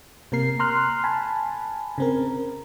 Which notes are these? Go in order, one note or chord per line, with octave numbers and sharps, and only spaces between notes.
C3 A#3 A#4 C7
A#5 C6 F6 F#6
G#5 A5 B5
C#3 C4 A#4